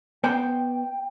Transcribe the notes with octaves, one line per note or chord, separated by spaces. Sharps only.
B3 C5 D5 G5